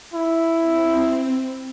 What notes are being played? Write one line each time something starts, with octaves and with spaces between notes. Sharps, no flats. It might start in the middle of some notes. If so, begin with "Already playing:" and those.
E4
C4